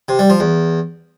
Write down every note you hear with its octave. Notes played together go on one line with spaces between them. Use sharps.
C3
G3
F3
E2